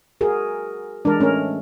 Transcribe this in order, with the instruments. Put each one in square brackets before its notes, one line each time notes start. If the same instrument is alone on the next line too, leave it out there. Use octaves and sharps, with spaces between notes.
[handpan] F#4 G#4 A#4
[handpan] E3 G#3 [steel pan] D4 A#4
[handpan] A3 [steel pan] C#4 A#4